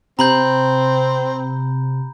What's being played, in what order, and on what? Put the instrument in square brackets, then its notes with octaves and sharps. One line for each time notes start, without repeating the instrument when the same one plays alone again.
[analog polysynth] C3 [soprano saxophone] C4 [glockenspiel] A#5 B5 G6